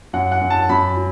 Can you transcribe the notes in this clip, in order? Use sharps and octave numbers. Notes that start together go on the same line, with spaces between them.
F#2 F#5
F#5
F#2
A5
F#2 B5
F#3